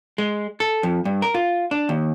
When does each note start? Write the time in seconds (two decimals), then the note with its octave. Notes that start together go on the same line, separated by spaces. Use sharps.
0.18 G#3
0.60 A4
0.83 F2
1.05 G2
1.22 A#4
1.34 F4
1.71 D4
1.89 D#2